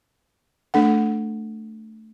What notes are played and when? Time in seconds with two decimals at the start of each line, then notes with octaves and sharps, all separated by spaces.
0.74 A3 D4 A4 F#5